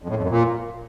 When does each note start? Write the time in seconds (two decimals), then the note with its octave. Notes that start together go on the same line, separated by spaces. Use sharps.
0.02 F2
0.09 A2
0.16 F2
0.23 F#2
0.30 A#2